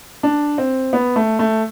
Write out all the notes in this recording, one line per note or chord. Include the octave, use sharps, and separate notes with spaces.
D4
C4
B3
A3
A3